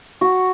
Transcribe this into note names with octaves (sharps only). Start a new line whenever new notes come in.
F#4